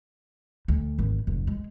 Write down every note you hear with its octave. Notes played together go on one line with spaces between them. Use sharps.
D2
G#1
F1
G#3